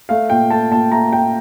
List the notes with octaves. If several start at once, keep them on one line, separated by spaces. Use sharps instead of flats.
A3 F5
A#2 G5
A3 A5
A#2 A5
A3 A#5
A3 G5